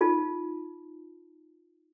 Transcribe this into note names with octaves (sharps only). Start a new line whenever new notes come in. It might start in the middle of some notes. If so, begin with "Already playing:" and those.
D#4 F4 A5